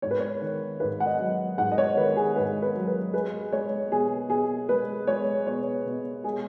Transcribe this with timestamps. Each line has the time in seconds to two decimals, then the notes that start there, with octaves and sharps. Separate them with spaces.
0.02 G#2 C#5
0.11 B4
0.20 C#5
0.42 D#3
0.80 G#2 B4
1.00 F#5
1.06 D#5
1.19 F#3
1.58 G#2 F#5
1.72 D#5
1.78 C#5
1.97 D#3 B4
2.17 G#4
2.36 G#2 B4
2.62 B4
2.75 F#3
2.87 B4
3.14 G#3 B4
3.52 G#3 C#5
3.91 B2 G#4
4.30 B2 G#4
4.69 G#3 B4
5.07 G#3 C#5
5.47 B2 C#5
5.86 B2
6.24 G#3 G#4